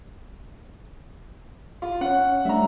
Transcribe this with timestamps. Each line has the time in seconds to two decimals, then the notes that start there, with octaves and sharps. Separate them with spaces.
1.82 F4
2.01 C#4 C#5 F#5
2.45 G3 A3 D4 E5 A#5